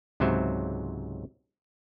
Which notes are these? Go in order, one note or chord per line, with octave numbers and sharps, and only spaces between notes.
C#2 G#2 C3 F#3 C5 E5